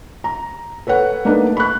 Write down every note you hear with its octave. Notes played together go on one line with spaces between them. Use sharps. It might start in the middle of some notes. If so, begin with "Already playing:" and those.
A#5
A4 B4 C#5 F#5
A3 A#3 D4 D#4 B4
B5 C#6 F#6